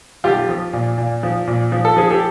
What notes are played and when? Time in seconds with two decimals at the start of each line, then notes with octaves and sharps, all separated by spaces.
0.24 B1 F4 G4
0.49 F3
0.73 A#2
0.98 A#2
1.23 F3
1.47 A#2
1.72 F3
1.85 A4
1.96 F3 G#4
2.11 G4 A4